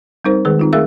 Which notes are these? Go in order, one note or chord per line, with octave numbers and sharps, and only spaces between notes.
G3 C4 D#4 A#4 C5
D#3 G#3 G#4 B4
C4 D#4 F4
A3 G#4 A#4 E5 F5 E6